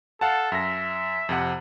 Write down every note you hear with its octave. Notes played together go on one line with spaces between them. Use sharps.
A4 F5 F#5 A5
F#2 E5 A#6
F2 C3 F#5